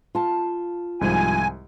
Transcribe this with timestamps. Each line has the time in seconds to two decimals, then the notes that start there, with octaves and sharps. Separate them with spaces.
0.15 F4 A5
1.01 C2 G#2 F3 G#5